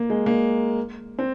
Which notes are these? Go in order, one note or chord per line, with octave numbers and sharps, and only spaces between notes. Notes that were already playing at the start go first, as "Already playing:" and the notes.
Already playing: A#3
G#3
A#3
C4